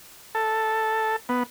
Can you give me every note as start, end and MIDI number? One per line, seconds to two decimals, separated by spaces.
0.35 1.16 69
1.29 1.43 59